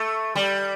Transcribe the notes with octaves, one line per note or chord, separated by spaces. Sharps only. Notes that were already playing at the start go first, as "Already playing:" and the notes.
Already playing: A3
G3